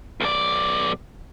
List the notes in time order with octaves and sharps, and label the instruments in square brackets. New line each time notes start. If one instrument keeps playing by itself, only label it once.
[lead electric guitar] B1 D5